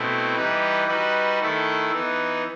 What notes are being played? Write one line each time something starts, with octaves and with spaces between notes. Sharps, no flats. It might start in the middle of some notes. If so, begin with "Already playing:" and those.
Already playing: B2 A3 C4 E4
E3 G3 D#4 G4 B4
G3 D#4 F#4 B4
D#3 A3 E4 A4
E3 B3 D#4